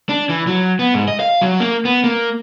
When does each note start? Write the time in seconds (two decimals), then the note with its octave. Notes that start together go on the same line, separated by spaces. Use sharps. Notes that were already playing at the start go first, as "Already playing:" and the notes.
0.09 D4
0.29 E3
0.47 F#3
0.79 B3
0.94 G#2
1.08 D#5
1.20 F5
1.42 F#3
1.60 A#3
1.85 B3
2.04 A#3